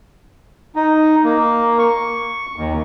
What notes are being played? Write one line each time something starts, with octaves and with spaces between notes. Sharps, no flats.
D#4
A#3
C#6
D#2